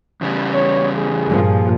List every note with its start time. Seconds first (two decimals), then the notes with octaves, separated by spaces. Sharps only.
0.21 E2 C#3 G3
0.54 C#5
0.97 G#4
1.27 G2 A#2 F3